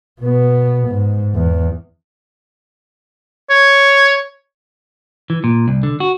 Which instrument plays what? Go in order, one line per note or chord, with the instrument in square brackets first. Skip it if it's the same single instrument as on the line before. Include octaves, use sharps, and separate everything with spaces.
[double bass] B2 B3
G#2
E2
[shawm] C#5
[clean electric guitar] E3
A#2
C2
D3
F#4